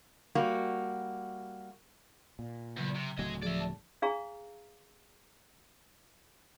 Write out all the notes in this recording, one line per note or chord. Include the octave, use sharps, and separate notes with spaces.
G3 A#3 F#4
A#2
E2 C#3 F#3
C3 C#6
D1 F#3 A3 D#5 G#5
F3 G#4 D5 E5
A5
D4 G#4 F5 A#5 C#6